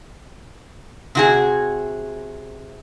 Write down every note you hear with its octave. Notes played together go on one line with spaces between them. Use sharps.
C3 F#4 G#4